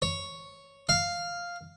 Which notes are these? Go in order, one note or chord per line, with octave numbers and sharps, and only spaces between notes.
C#5
F5